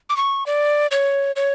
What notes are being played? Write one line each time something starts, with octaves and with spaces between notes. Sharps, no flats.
D6
C#6
D5
C#5
C#5